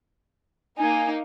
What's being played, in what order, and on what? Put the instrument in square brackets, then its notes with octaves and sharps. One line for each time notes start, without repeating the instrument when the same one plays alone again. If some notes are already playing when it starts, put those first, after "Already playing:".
[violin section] A#3 D#4 [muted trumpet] G#5